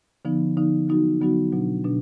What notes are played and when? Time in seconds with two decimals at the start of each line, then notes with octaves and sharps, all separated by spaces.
0.25 D3 F3 B3 D#4
0.57 D3 F3 B3 D#4
0.88 D3 F#3 B3 D#4 F#4
1.21 D3 F#3 B3 D#4 F#4
1.52 B2 F#3 D4
1.84 B2 F#3 D4